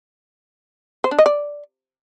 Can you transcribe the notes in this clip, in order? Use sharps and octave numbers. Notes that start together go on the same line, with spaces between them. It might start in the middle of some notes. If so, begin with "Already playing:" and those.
C5
D4
D#5
D5